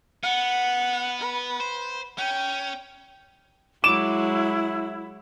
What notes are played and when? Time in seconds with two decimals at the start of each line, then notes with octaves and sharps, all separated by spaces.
0.24 B3 F#5
1.21 B4
1.60 C5
2.18 C#4 G5
3.84 F#3 G#3 E4 D6 E7